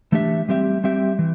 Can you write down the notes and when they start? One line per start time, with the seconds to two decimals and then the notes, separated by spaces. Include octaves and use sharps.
0.12 E3 A3 D4 G4 E5
0.49 G3 C4 G4 E5
0.84 G3 C4 G4 E5
1.19 E3